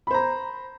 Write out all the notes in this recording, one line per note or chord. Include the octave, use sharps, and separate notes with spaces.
C5 A#5 B5